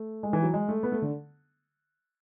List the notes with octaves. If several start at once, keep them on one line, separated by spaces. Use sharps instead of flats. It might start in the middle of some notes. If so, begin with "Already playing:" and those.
Already playing: A3
G#3
E3
F#3
G#3
A3
B3
A3
D3